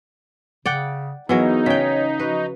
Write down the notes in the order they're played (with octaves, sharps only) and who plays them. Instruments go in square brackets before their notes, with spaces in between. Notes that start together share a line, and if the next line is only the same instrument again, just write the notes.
[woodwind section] C#3 [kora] D5 F#5 G5
[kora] E3 F#3 A#4 [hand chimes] B3 [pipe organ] D#4 [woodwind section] G#4 D#5
[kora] C#3 G5 [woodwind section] C#5 [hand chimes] B6
[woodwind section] F3 F#4 [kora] B4